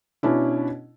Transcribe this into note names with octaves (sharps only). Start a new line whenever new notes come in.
B2 C#4 D4 E4